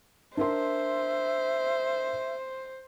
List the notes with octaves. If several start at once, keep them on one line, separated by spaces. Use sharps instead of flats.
D4 A#4 C5 E5 C6